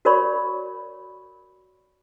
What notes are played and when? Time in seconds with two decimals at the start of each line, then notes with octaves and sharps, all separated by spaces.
0.05 F#4 A#4 C#5 D5 B5 C#6